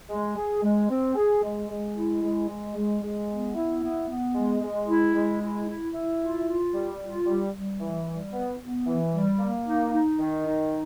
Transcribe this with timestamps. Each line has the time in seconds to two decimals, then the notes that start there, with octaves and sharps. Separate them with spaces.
0.10 G#3
0.37 G#4
0.62 G#3
0.89 C4
1.15 G#4
1.43 G#3
1.69 G#3
1.95 E4
2.22 G#3
2.49 G#3
2.75 G#3
3.01 G#3
3.29 B3
3.55 E4
3.82 B3
4.08 B3
4.35 G#3
4.62 G#3
4.88 E4
5.15 G#3
5.41 E4
5.68 E4
5.94 E4
6.21 F4
6.48 F4
6.73 G3
7.00 F4
7.27 G3
7.53 G3
7.80 E3
8.07 G3
8.33 B3
8.60 B3
8.87 E3
9.13 G3
9.39 A#3
9.66 D#4
9.93 D#4
10.19 D#3
10.46 D#4